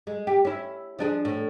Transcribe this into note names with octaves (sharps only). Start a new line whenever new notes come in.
G#3
G4
C#4 E4
F3 D4 G#4
A2